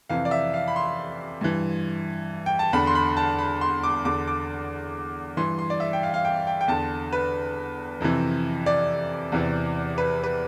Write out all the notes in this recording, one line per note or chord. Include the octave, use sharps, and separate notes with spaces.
F2 C3 E3 F5
D5
E5
F5
B5
C6
G2 E3
G5
A5
E2 D3 B5
C6
B5
A5
B5
C6
D6
E2 D3 D6
D6
G2 E3 C6
C6
D5
E5
G5
F5
F5
G5
G5
G5
E2 D3 A5
B4
F2 C3 E3
D5
E2 C3 E3
B4
B4